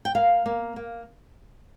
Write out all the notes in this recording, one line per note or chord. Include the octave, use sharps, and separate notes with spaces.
G5
A#3 F5
A#3
A#3